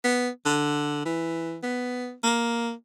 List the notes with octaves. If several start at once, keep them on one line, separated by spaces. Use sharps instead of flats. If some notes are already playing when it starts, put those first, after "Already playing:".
B3
D3
E3
B3
A#3